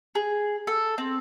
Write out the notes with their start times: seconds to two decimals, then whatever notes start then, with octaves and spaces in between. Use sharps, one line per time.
0.15 G#4
0.67 A4
0.98 C4